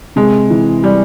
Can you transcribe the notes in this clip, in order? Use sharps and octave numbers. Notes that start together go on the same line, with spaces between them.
C3 G#3
E3
G3